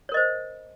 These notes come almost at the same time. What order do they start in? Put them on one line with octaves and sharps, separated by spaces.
C#5 A#4 D#5 C5